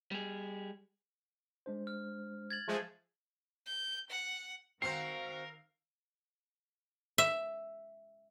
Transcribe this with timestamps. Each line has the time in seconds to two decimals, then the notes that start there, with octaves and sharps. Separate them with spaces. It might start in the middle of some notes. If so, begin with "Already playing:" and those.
0.11 G3 G#4
1.66 G#3 D4 C5
1.87 F6
2.51 G#6 A6 F#7
2.67 F3 G#3 A3
3.66 G6
4.10 F#5
4.82 D#3 C4 F#4 A#4 C5 F5 C7
7.18 E5